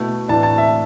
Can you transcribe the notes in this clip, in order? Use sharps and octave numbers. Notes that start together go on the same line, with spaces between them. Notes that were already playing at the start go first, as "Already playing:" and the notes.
Already playing: B2 A3 E4
A2 E3 D4 A5
A5
E5